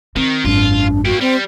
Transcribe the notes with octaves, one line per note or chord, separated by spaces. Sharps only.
D#3 C4
G#1 F#2 D4 F4
A#3 F#4 G4
G3 C4